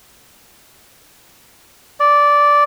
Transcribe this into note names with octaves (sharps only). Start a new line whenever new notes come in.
D5